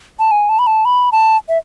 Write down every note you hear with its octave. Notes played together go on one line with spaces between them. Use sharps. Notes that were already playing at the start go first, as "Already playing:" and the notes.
A5
G#5
A5
B5
A5
B5
A5
E5